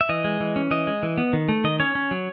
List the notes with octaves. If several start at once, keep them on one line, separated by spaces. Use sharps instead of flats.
E5
E3 D#5
G#3
E3
C#4
E3 D#5
G#3
E3
B3
D#3
A3
D#3 D#5
C#4 C#5
C#4
F#3